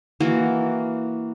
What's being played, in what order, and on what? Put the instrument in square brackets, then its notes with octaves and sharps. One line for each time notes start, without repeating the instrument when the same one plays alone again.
[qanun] E3 A#3 F#4